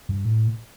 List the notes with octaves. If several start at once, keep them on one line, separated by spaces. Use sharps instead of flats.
G2
A2